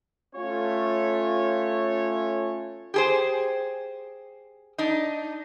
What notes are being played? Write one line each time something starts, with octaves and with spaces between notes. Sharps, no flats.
A3 C#4 F4 C#5
G4 G#4 C5
D4 D#4